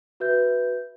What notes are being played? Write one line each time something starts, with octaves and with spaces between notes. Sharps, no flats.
F#4 B4 E5 G6